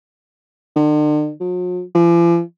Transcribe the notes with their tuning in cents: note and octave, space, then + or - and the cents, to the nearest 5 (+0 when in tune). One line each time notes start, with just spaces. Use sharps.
D3 +45
F#3 -45
F3 -45